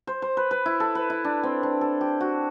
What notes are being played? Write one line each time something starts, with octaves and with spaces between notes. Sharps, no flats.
C5
C5
B4
B4
E4
A4
B4
E4
D4
C4
D4
A4
G4
F#4